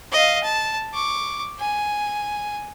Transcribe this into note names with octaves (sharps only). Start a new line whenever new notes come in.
D#5 F5
A5
C#6 D6
G#5